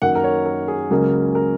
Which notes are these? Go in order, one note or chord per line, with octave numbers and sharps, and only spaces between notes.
F#2 D#3 A#3 F#5
A#4
C#5
A#4
G#4
C#2 C#3 F#3 A#3 C#4 A#4
A#4